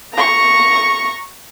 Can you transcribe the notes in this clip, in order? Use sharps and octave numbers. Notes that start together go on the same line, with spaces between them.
A#5 C#6